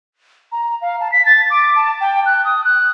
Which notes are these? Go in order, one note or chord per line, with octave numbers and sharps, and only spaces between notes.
A#5
F5
A5
B6
A6
D6
A5
G5
F#6
D#6
F#6